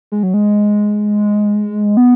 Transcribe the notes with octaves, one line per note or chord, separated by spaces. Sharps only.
G#3
F#3
G#3
B3